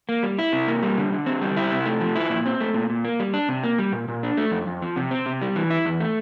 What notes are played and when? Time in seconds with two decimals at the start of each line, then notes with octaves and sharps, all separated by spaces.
0.09 A#3
0.23 G3
0.39 E4
0.53 C3
0.68 A#3
0.83 G3
0.98 D3
1.13 D3
1.26 C4
1.42 G3
1.57 E4
1.72 C3
1.86 A3
2.01 F3
2.16 E4
2.30 A#2
2.46 C4
2.60 A3
2.74 A#2
2.90 A#2
3.05 A#3
3.20 G3
3.34 D4
3.49 C3
3.64 A#3
3.79 G3
3.92 A#2
4.08 A#2
4.23 D4
4.37 A3
4.52 F2
4.67 F2
4.82 F3
4.96 C3
5.11 C4
5.26 C3
5.42 G3
5.56 E3
5.70 E4
5.86 E2
6.00 A3